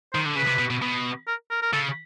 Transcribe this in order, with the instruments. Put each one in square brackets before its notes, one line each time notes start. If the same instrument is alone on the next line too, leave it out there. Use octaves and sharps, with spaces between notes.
[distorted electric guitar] D#3 [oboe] C5
[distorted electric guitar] D3
[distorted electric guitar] C#3 [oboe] B4
[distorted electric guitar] C3
B2
B2
B2
[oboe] A#4
A#4
A#4
[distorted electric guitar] C#3 [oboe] A4